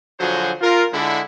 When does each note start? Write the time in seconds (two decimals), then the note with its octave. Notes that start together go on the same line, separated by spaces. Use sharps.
0.20 D3 F3 F#3 F#4 G#4 C5
0.61 F4 A#4
0.93 D3 G#3 E4